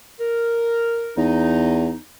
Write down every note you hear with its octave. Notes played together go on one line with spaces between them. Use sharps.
A#4
E2 D#4